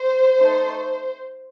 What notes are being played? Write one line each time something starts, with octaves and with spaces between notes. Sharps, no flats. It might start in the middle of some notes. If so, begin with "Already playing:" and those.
Already playing: C5
A3 D#4 A4